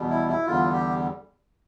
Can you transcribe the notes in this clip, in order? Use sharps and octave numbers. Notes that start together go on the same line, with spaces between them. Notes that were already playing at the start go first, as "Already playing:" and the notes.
Already playing: E2 B2 G3
E4
E4
E2 D3 G3 F4
G4